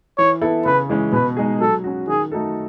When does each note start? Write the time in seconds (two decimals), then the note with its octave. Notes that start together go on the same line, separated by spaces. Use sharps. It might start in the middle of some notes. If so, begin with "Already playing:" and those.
0.18 E3 C#5
0.41 B3 E4 A4
0.65 C#3 B4
0.89 E3 G#3 C#4
1.12 B2 B4
1.37 G#3 D#4 G#4
1.60 F#3 A4
1.84 C#4 F#4
2.08 D#3 G#4
2.32 A3 D#4 F#4 A4